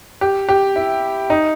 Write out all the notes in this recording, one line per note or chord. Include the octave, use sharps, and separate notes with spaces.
G4
G4
E4
D#4